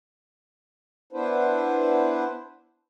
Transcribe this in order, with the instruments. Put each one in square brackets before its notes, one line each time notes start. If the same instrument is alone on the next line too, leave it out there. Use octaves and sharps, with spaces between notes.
[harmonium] B3 D4 E4 B4 C5